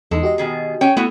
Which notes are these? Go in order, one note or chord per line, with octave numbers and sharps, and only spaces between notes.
E2 E3 G#3 D#4 A4
F#4 G4 D#5
B2 D#3 G#4
C#4 C#5 G5
A3 B3 E4 F#4